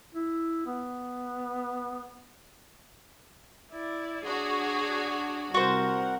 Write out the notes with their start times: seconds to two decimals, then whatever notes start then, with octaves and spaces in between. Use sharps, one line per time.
0.14 E4
0.66 B3
3.71 E4 D5
4.24 D4 F#4 G#4 C#5
5.54 C2 F#4 A#4 C5 F#5